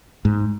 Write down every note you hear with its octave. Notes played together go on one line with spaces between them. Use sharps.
G#2